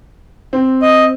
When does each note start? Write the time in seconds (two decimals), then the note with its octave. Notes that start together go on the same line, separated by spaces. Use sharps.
0.53 C4
0.82 D#5